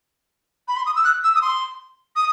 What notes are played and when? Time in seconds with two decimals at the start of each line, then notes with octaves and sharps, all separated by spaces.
0.68 B5
0.76 C6
0.86 D#6
0.96 E6
1.04 F#6
1.23 E6
1.35 D#6
1.41 C6
2.16 D#6